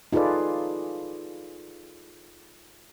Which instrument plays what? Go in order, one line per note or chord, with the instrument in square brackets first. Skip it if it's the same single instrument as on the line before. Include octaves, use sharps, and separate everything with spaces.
[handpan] D#4 F4 G#4 A4 B4 D5